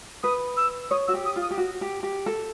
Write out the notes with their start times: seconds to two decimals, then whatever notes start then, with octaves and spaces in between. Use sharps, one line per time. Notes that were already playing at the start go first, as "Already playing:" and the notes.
0.23 B4 D#6
0.56 E6
0.90 C#5 D#6
1.07 F#4 E6
1.14 G4
1.25 D#6
1.36 F4
1.41 D#6
1.51 G4
1.58 F#4
1.81 G4
2.03 G4
2.26 A4